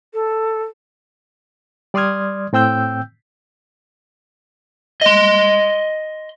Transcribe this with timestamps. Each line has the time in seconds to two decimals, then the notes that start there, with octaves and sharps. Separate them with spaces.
0.14 A4
1.94 G3 D5 C6 D#6 F6 G#6
2.53 A2 C4 G5 E6 G6
5.02 D#5 C6